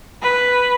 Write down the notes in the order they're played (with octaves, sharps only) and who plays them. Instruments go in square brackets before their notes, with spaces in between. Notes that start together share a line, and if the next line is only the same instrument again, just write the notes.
[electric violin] B4